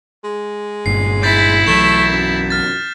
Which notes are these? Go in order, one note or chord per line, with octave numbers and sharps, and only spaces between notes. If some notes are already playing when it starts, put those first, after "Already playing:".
G#3
G1 G2 A#2 C7
E4 G6 A6 B6
B1 E3 F#3 A3 E7
F#2
F6 A6